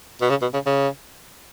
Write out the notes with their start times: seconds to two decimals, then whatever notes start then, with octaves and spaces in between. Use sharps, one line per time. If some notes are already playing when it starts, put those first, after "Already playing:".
0.21 B2
0.30 C#3
0.42 B2
0.54 C#3
0.66 C#3